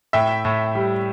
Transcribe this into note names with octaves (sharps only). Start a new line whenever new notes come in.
A2 E5 G5
A2
G3